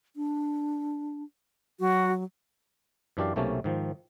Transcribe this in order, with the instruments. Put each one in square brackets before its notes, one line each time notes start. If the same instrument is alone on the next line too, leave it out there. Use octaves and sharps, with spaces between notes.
[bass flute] D4
[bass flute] F#3 [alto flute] F#4
[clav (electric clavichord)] F#2 E3 D4 G4 D5 F5
B1 C3 A3 A#3 C#4 A5
G#2 D#3 F3